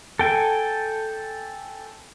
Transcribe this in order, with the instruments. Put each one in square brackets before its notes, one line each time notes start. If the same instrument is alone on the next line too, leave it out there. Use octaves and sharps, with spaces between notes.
[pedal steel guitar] A4 G5 G#5